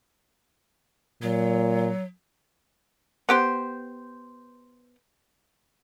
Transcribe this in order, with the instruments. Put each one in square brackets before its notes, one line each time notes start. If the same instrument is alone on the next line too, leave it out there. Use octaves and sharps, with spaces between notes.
[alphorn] A#2 [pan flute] F#3
[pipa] B3 G4 C5